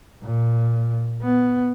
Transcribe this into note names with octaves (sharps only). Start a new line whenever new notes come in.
A#2
B3